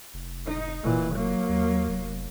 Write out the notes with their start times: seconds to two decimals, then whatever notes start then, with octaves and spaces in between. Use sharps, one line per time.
0.14 F1
0.47 D#4
0.83 F1 A#2 E3
1.14 F#3 A#3
1.49 D#2
1.89 F1